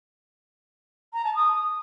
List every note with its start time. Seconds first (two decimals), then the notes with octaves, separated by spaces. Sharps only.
1.13 A#5
1.24 A5
1.35 D#6